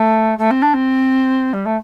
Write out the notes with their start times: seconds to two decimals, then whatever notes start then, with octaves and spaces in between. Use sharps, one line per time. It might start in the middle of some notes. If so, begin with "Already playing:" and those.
Already playing: A3
0.38 A3
0.51 C4
0.62 D4
0.74 C4
1.53 G3
1.66 A3